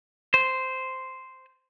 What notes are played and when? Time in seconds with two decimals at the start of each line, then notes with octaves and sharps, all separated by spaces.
0.34 C5